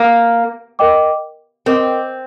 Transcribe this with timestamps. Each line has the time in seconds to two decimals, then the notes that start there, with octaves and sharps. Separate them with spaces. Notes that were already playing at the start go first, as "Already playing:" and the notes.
Already playing: A#3
0.79 A#4 D#5 G5 D6
1.66 C4 A#4 D#5 G5 D6